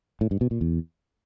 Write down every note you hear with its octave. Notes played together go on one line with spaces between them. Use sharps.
A2
G2
B2
A#2
E2